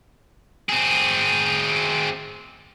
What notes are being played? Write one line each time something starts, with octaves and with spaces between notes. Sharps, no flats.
C4 G#4